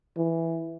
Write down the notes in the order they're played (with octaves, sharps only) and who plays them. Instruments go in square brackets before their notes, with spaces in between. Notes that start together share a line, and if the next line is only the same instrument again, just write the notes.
[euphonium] E3